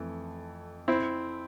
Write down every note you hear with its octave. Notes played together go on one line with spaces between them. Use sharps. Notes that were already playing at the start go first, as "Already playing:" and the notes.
Already playing: F2 E3 A3
C4 E4